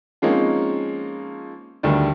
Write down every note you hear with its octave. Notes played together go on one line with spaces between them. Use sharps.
F3 G#3 A#3 C4 C#4 D#4
D2 D3 D#3 G3